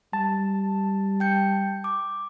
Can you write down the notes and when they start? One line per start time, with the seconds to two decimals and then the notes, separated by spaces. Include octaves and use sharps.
0.13 G3 A5
1.20 G5 G6 C#7
1.84 D6